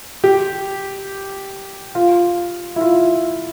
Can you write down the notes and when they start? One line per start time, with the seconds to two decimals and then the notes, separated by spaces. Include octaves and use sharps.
0.24 G4
1.95 F4
2.76 E4
2.81 F4